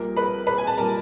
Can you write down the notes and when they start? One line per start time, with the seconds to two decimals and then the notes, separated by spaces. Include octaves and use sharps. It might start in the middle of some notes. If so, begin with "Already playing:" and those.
Already playing: A#1 A#2 G3 A#4
0.17 B4 B5
0.47 B4 B5
0.58 G#5
0.67 A5
0.77 A#2 G3 A#4 A#5